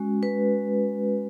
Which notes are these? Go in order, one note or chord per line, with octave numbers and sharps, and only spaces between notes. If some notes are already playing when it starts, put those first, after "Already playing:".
Already playing: G#3 C#4 F#4
B4